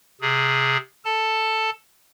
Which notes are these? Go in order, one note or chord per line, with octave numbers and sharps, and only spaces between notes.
C3 G#4
A4 A5